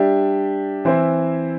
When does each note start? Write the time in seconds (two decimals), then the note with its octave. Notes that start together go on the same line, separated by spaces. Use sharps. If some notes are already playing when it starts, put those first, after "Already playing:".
Already playing: G3 D4 G4 E5
0.85 E3 C4 E4 C5 E5